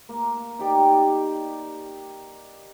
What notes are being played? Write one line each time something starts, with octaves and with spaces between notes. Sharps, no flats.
A#3
D#4 G4 D5